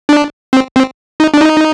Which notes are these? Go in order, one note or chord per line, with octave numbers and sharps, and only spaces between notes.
D4
C4
C4
D#4
D4
D#4